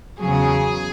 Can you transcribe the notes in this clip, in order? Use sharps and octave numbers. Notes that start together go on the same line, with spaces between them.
E2 C#3 F#3 G#4